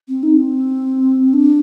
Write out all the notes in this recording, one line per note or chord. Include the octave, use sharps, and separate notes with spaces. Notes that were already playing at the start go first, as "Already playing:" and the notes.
C4
D#4
C4
D4